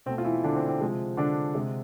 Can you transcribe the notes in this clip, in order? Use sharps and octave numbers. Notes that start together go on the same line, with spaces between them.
B2 A3 C4
F4
E3 E4
D3 D4
C4
C4
C3 F3 G#3
D3 D4
C3 G#3